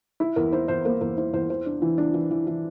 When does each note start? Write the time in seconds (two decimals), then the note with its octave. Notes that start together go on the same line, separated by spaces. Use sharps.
0.20 E4
0.36 E2 A#4
0.52 E4 C5
0.68 E2 C5
0.85 A#3 C5
1.01 E2 A#4
1.17 E4 C5
1.33 E2 C5
1.50 E3 C5
1.66 D4
1.82 E3
1.98 D4
2.14 E3
2.31 E3
2.47 E3